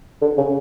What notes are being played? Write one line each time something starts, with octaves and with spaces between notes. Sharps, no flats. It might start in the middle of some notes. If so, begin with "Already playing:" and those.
D3
C#3